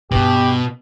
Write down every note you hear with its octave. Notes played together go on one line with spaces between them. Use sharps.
G2 B2 B3 G4